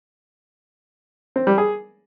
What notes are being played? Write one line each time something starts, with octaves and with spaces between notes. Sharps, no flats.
C4
G3
G#4